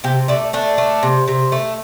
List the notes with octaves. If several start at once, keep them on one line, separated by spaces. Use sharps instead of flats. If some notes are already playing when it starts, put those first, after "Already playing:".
C3 G4
A3 D4
A3 D4
A3
C3
C3
A3